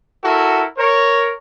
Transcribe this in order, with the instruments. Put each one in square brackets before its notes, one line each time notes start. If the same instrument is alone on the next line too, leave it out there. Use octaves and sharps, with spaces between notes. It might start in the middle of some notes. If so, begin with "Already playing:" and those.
[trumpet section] E4 F#4 A4 A#4
A#4 C#5